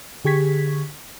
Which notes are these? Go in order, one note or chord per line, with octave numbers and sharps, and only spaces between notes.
D3 G4 G#4 C#6 G#6 B6